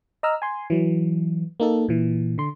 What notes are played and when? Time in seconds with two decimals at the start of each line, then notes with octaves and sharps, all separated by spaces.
0.23 D#5 A#5 E6 F6
0.42 G#5 C6
0.70 E3 F#3
1.60 A#3 D#4 A4
1.88 A#2 E3
2.38 D3 C6